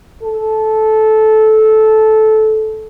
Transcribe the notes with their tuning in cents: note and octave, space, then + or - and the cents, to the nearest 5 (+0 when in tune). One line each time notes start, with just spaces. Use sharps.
A4 -15